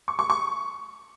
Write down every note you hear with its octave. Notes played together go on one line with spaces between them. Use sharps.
C#6
C#6
C#6